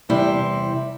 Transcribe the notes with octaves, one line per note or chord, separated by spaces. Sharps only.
E2 C3 G3 C4 E4